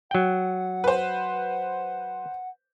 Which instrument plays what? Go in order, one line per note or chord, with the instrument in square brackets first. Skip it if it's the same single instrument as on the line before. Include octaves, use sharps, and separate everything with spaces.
[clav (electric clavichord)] F#3 G5 [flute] F#5
[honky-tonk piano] B4 C5